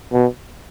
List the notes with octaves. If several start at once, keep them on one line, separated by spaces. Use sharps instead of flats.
B2